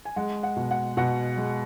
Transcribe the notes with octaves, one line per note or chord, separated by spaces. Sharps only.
G#5
G#3 F#5
F#5
B2
F#5
B2 F#5
G#3